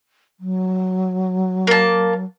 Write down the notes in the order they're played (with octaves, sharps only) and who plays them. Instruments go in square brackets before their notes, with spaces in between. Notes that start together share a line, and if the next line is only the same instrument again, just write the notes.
[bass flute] F#3
[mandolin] A#3 A5